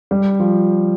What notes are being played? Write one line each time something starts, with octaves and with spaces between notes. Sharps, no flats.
G3
F3